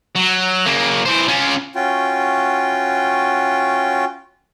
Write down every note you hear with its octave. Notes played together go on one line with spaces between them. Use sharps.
F#3
C#3 A#3
E3 C5
C#4 F4
C#4 F4 F#4 G5